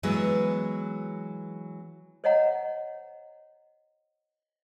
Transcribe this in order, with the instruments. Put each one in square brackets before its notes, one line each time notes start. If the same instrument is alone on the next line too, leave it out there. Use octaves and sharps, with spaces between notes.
[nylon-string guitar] E3 F#3 G#3 B3
[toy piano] C5 C#5 D#5 F5 F#5 A#5